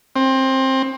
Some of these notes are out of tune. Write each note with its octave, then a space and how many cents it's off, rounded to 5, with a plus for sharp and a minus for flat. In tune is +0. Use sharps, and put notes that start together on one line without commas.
C4 +20